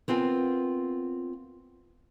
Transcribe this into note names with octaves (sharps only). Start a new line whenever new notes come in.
B3 C4 F4 A#4 G#5